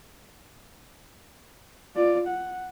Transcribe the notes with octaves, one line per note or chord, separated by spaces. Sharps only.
F4 D5
F#5